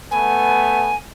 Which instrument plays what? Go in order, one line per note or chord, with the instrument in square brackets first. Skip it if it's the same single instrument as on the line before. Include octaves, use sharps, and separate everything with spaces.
[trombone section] A3 B3 [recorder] G#5